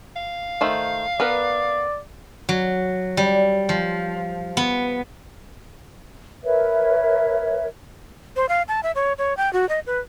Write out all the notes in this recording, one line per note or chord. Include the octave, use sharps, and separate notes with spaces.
F5
D#3 A3 C5
B3 A#4 B4 D5
F#3
G3
F3
B3
A#4 B4 C#5 E5
C5
F5
A5
E5
C#5
C#5
G5
F#4
D#5
B4